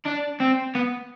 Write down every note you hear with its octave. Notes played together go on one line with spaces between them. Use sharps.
D4
C4
B3